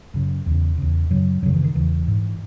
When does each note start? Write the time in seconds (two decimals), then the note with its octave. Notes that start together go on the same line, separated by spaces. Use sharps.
0.14 F#2 C#3
0.46 E2 C#3
0.78 E2 C#3
1.10 F#2 C#3 F#3
1.43 F#2 C#3 F#3
1.54 E3
1.64 D#3
1.75 E2 C#3 E3
2.07 G#2